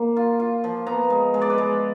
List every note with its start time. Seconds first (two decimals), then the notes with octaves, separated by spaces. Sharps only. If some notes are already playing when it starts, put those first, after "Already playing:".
Already playing: A#3
0.17 F4
0.40 F4
0.64 F3
0.87 B3 A#5
1.10 G#3
1.34 G#3
1.42 D5
1.50 B4
1.58 G#3